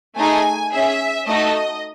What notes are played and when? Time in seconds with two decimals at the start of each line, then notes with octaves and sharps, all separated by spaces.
0.16 A3 D#4 G#4 G#5
0.71 C#4 G#4 E5
1.27 A3 D#4 F#4 A4 D#5